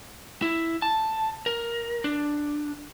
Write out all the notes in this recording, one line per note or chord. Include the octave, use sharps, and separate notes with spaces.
E4
A5
A#4
D4